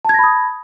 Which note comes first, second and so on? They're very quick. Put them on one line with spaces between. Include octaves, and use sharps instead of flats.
A5 G#6 A#6 B5 D#6